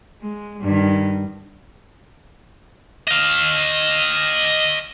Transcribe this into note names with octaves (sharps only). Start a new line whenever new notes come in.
G#3
G2 D#3
D#5 F5